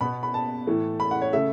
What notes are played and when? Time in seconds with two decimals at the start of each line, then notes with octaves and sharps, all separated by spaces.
0.01 B2 B3 B5
0.23 B5
0.34 A5
0.67 A2 E3 A3
1.00 B5
1.11 F#5
1.22 C#5
1.33 C#3 A3 E5